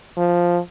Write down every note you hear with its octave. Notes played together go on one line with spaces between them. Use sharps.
F3